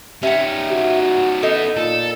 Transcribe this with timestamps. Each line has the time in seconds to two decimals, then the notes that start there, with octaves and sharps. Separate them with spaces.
0.23 C#4 D#4 G4 E5 F#5
0.72 F#4
1.43 B3 D#4 E4 A4
1.77 A#2 A4